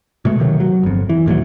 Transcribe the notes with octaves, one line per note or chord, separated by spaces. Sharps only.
B2 G#3 A3
C3 D#3 F3 F#3
F#3
G1 F2
E3
D#2 A#2 F3 F#3